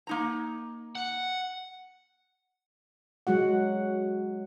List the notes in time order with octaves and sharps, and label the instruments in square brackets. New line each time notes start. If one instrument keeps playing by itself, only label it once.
[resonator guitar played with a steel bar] A#3 D#4 A#5
[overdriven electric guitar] F#5
[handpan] F#3 G#3 F#4 F#5